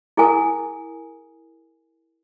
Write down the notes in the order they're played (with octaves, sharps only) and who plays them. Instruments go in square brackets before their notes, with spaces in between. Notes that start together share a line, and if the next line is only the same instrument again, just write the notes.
[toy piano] E4 G#4 A#4 G#5 D#6